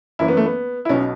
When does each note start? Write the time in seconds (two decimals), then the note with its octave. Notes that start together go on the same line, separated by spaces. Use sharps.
0.19 F#1 F#2 E3 E4
0.28 B3
0.37 A3
0.46 B3
0.85 E4
0.89 B1 B2 C#4